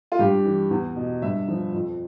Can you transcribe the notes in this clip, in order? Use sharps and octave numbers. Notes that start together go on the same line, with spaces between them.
F4
G2 G4
E3
E2
B2
G2 E5
F3
F2